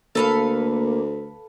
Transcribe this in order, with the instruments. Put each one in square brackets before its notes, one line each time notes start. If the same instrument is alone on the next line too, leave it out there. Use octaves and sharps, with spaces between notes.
[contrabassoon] D2 [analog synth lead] A#3 [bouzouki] A4 B4 F5